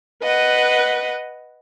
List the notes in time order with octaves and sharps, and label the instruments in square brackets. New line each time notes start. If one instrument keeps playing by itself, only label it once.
[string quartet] B4 D#5 F#5